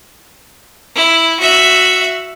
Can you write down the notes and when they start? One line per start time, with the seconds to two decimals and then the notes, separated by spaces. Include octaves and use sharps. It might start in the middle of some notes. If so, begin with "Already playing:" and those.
0.95 E4
1.40 F#4 E5